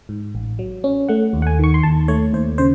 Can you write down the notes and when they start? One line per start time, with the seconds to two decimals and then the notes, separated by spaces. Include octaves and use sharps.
0.09 G#2
0.35 A1
0.59 F#3
0.84 C#4
1.08 A3 F#5
1.33 D#2
1.42 F#5
1.47 G#5
1.59 D#3 C#6
1.74 C6
1.83 D#2 A5
2.08 A3 C#5
2.33 D#2 C5
2.58 C#3 C5